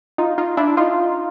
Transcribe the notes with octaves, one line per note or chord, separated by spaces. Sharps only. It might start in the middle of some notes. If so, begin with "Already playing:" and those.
D#4 F4
D#4 F4
D4 E4
D#4 F4